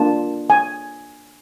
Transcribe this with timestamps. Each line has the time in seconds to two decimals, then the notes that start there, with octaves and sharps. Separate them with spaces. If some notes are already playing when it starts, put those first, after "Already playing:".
Already playing: A#3 D4 F4 A5
0.50 G#5